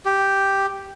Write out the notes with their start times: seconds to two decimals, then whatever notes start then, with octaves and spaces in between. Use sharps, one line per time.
0.05 G4